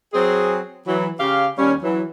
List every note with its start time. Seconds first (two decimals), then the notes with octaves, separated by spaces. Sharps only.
0.14 F#3 C4 G#4
0.86 E3 F#3
1.20 C#3 C#4 G4 F5
1.59 D#2 G3 C#4
1.83 E3 F#3